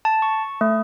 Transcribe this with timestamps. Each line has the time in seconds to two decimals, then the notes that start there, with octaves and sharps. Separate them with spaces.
0.05 A5
0.22 C#6
0.61 A3